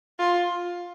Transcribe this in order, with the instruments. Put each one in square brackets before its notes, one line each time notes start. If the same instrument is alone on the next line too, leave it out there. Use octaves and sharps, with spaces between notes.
[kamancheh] F4